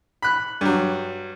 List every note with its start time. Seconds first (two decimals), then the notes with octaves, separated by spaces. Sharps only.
0.22 B5 F#6
0.61 G2 F#3